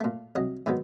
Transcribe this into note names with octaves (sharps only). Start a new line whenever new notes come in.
A#2 A3
C2 F#3 D#5
G#2 D3 D#3 F#3 B3